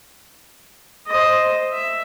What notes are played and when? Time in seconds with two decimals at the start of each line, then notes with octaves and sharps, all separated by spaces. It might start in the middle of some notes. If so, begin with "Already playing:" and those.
1.07 C5 D#5
1.73 E5